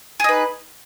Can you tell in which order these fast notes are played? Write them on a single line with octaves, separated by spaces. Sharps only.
G#4 D#4 B4